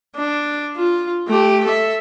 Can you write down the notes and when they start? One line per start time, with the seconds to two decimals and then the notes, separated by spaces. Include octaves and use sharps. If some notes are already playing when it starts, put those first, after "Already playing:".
0.16 D4
0.76 F4
1.28 A3 G4
1.65 A4 E5